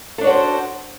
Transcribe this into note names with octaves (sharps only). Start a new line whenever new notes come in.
D4 F#4 A4 C5 C#5